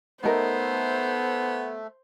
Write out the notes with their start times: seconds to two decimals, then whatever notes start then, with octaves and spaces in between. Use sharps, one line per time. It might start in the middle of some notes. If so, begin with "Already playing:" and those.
0.24 A3 B3 D#4 A#4 C5